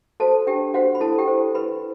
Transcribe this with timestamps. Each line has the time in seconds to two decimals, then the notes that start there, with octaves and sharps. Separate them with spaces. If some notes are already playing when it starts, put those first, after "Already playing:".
0.20 F#4 A4 C5 A5
0.47 D4 G4 G5
0.74 F#4 C5 F#5
0.95 B5
1.00 E4 A4 A5
1.18 G4 G5
1.27 A4 C5
1.54 E4 B4 B5